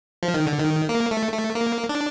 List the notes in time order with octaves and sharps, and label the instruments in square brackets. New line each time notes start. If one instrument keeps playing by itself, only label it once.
[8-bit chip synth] F3
D#3
D3
D#3
A#3
A3
A3
A#3
D4